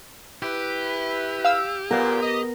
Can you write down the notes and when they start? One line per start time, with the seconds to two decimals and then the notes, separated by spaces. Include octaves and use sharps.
0.42 E4 G4 B4
1.44 F5 E6
1.91 A#2 B3 C4 G#4 A#4
2.22 D#5